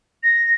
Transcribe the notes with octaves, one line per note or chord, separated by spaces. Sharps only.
A#6